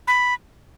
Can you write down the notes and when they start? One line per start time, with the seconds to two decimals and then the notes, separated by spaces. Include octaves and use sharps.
0.07 B5